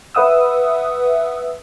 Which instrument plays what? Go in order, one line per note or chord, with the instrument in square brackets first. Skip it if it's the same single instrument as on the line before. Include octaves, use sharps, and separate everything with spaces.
[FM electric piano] B4 E5 F#5 D#6 E6